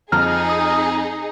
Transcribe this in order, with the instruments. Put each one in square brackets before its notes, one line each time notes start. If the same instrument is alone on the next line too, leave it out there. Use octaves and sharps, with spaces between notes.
[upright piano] F2 F3 A#5 [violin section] D#4 G#4 [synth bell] F6
[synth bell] D#6